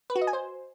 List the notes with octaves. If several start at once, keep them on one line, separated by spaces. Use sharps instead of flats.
B4
F#4
D#5
G#5
C5